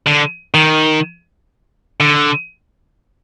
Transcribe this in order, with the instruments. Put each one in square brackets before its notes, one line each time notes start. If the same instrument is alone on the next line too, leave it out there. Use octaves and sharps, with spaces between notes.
[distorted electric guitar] D3
D#3
D3